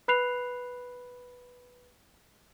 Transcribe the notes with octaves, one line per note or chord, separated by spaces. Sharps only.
B4 B5 F#6 C7 F7